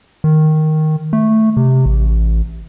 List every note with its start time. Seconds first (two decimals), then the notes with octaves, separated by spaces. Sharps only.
0.24 D#3
1.13 A3
1.57 C3
1.86 A1